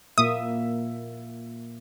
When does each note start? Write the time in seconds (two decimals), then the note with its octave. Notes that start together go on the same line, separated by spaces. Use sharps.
0.18 A#2 A#3 E5 D#6